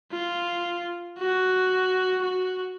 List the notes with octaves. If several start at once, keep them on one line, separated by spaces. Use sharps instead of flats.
F4
F#4
F#4